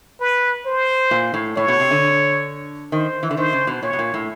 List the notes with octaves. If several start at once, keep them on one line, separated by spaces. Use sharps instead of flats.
B4
C5
A#2
A2
A2 C#5
B2
C3
D3
D#3 C5
E3
D3
D#3 C5
C#3
B2
A#2 C#5
B2
A#2
A2